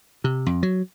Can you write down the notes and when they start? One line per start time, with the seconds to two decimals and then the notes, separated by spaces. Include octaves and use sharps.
0.24 C3
0.46 F2
0.63 F#3